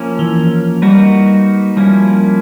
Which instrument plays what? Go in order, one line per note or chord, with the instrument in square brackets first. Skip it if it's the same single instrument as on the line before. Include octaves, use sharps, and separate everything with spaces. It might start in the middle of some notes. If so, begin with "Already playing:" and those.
Already playing: [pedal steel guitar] F3 A#3 C#4
[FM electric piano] E3
[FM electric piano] G3 [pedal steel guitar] A#3 D#4 F#4 B4
[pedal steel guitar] F3 A#3 C#4 E4 [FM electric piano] G3